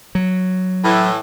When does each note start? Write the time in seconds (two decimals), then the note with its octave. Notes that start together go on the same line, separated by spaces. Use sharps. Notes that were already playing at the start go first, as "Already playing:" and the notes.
0.15 F#3
0.84 A2 E3